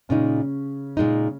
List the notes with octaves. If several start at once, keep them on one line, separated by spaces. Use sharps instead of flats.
A#2 C#3 G#3 C#4 D#4
A#2 G#3 D#4